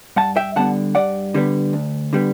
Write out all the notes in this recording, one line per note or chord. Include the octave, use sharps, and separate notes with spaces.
G2 F#5 A5
E5 G5
D3 G3 B3 F#5 A5
G2 D5 F#5
D3 G3 B3
D2
D3 G3 B3